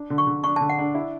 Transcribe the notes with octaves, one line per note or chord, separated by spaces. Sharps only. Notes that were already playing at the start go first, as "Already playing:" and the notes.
Already playing: D4
D3
C#6
D3
D4 C#6
D3 A5
F#5
D4
E4